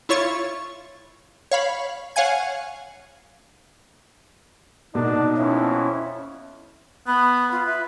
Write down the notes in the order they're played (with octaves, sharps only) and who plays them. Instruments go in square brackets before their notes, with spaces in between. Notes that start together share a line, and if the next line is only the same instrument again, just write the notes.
[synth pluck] E4 F4 C#5 C#6 A6
C#5 F5 B5
C#5 F5 F#5 G#5 G#6
[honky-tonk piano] B2 A#3 [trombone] D4 [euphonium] D#4
[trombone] F2 [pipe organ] C#4 E4
[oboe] B3 [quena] B5
[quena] F4
[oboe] B4 [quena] E5